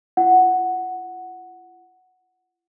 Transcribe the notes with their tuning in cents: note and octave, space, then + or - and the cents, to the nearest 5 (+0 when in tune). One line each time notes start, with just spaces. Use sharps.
F4 -45 F#5 +0